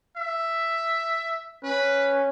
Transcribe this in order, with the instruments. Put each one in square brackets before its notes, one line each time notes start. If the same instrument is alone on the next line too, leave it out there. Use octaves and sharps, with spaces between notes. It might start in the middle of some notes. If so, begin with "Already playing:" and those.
[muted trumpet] E5
[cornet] C#4 [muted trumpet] B4